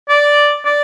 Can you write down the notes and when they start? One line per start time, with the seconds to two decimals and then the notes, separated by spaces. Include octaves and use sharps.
0.09 D5
0.66 D5